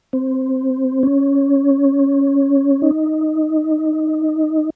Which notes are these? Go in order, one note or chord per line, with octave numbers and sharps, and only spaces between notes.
C4
C#4
D#4